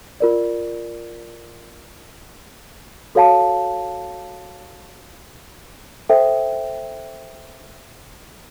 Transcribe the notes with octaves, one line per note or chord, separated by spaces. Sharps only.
F4 A#4 D5
F#4 A4 C#5 F5 A5
A4 C5 E5 G5